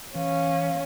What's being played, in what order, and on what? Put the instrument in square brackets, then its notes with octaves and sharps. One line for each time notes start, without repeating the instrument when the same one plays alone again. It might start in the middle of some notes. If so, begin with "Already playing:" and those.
[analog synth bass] E3 [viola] C#4 [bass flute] F5